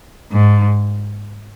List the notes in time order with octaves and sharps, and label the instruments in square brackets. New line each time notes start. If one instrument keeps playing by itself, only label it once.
[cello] G#2